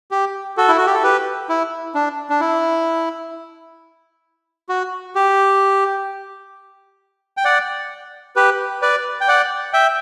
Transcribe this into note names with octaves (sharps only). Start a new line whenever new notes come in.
G4
F#4 A4
E4
F#4
G4
A4
G4 B4
E4
D4
D4
E4
F#4
G4
G5
D5 F#5
G4 B4
B4 D5
G5
D5 F#5
E5 G5